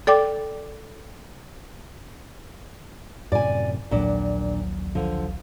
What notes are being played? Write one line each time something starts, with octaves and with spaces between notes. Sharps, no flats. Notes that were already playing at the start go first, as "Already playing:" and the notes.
A4 D5 G5 D6
F#2 A2 C3 D5 G#5
A#1 D#2 A#2 F#3 D4
D3 F3